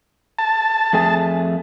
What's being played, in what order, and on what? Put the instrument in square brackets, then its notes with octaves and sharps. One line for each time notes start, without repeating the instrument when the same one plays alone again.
[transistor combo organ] A5
[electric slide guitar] F2 A3 G#4